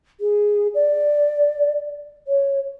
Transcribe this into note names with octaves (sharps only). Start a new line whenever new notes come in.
G#4
D5
C#5